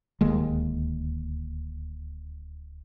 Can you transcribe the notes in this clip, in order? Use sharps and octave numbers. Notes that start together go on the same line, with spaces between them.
D1 D#2 G#3